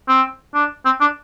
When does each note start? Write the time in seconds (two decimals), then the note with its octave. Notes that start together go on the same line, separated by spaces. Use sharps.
0.08 C4
0.54 D4
0.85 C4
1.01 D4